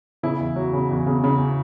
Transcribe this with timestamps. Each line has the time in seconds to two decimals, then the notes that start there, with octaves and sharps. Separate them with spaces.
0.23 C#3 E4
0.40 E2
0.56 F#3
0.73 C#3
0.90 E2
1.06 C#3
1.24 C#3